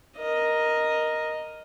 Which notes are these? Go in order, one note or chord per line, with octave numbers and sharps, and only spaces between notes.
A#4 D#5